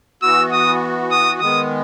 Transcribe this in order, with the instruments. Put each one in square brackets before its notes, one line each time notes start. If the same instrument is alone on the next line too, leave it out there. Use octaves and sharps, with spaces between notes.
[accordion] E3 B3 F#4 [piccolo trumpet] E6
[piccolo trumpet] D#6
D#6
[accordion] D#3 G#3 B3 [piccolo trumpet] D#6